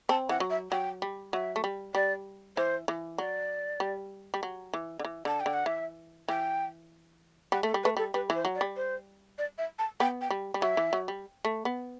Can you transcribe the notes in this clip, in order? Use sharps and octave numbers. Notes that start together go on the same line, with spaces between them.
C4 A5
E3 F#5
F#3
E5
F#3 G5
G3
F#3 E5
A3
G3
G3 D5
E3 C5
E3
F#3 D5
G3
G3
F#3
E3
D3
E3
D3 A5
G5
D3
F#5
E3 E5
E3 G5
G3 F#5
A3 A4
G3
A3 B4
G3 A4
G3 B4
E3
C5
F#3
D5
G3
C5
D5
E5
A5
B3 G5
G5
G3
G3
F#3 E5
E3
F#3
G3
A3
B3